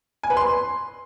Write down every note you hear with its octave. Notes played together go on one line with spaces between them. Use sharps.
G#5
B4
C6